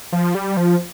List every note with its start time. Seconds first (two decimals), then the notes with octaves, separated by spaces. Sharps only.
0.12 F3
0.35 G3
0.57 F3